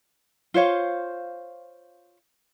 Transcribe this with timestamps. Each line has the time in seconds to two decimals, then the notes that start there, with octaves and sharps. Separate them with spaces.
0.54 F4 C5 C#5 F5